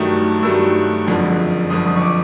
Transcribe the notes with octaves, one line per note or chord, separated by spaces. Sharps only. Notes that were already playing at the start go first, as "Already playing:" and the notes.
Already playing: G2 D#3 F#3 A3 D#6
G2 D#3 F#3 A3 E6
F#1 F2 D3 F3
F#1 F2 D3 F3 D#6
D#6
C#6
D6